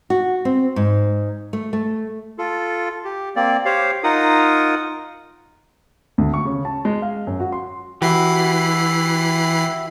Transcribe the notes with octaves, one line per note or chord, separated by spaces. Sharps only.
F#4
C4
G#2
A3
A3
F4 A4
G4
A#3 C4 D5
G4 C5 C#5 F5
D#4 F4 A#4 F#5 D#6
D2
C#6
C#3
A5
G#3
F5
F#2
F#4
C6
E3 E4 F#4 G4 B5 C7